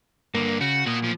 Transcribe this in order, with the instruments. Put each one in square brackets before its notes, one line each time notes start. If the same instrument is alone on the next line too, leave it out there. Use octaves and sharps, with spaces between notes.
[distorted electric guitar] G2 D3 [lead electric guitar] A#3
[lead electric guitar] C#3 [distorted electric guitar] F#4
[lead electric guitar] A#2 [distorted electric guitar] F#4 D#5
[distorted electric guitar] B1 F3